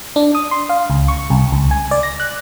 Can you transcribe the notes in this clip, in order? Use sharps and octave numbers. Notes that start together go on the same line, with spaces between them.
D4
D#6
C6
F5
C#2
C#6
C2
C#2
G#5
D5
A#6
F#6